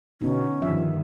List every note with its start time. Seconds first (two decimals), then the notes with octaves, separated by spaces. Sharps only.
0.22 B2 D3 B3 C#4 D#4
0.62 G2 D#3 F3 E5